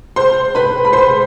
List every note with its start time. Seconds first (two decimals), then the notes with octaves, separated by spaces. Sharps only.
0.16 C5 C6
0.55 B4 B5
0.85 B5
0.93 C5 C6